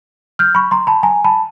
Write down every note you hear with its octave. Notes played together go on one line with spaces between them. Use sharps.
F6 G6
B5 C#6
A#5 C6
A5 B5
G#5 A#5
A5 B5